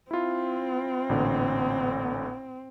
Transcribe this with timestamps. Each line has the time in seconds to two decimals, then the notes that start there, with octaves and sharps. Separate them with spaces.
0.11 C4 E4 F4
1.09 A1 A#2 D3